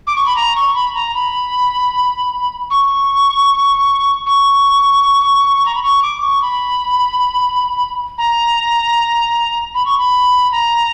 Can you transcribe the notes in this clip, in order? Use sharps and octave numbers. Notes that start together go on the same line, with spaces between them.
D6
C#6
B5
A#5
C#6
B5
A#5
B5
C#6
C#6
A#5
B5
C#6
D6
C#6
B5
A#5
B5
C#6
B5
A#5